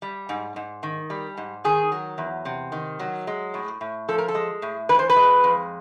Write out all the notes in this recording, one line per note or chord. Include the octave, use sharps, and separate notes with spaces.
G3
G#2
G#2
D#3
G3
G#2
D#3 G#4
F#3
E2
C3
D#3
F#3
G#3
A2
A2
F3 A4
A#4
A4
G#3
A2
E3 B4
C5
B4
G#3
F2